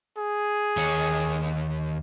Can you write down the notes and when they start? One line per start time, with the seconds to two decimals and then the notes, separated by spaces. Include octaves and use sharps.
0.18 G#4
0.77 D#2 C#5